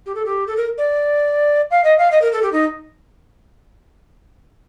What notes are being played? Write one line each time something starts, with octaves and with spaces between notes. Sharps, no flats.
G4
A4
G4
A4
A#4
D5
F5
D#5
F5
D#5
A#4
A4
G4
D#4